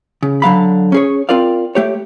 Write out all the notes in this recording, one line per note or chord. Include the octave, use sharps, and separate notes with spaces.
C#3
D3 F#3 F5 B5
C#4 G#4 C#5
C4 F4 A#4 D5 F5
A3 G4 C#5